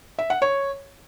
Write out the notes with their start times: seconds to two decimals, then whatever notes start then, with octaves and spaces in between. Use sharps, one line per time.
0.18 E5
0.30 F#5
0.42 C#5